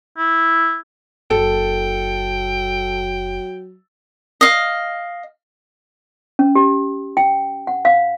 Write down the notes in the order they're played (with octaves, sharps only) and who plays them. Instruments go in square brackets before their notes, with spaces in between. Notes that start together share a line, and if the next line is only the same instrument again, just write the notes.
[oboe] E4
[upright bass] F#1 [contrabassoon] F#3 [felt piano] A4 [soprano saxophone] G5
[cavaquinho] D#5 F5
[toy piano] C#4
G4
G5
F#5
F5